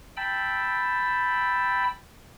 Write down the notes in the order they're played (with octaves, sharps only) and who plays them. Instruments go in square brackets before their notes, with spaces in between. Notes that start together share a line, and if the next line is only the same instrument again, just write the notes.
[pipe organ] G5 A5 B5 E6